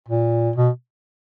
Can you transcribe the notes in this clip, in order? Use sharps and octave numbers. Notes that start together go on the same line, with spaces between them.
A#2
B2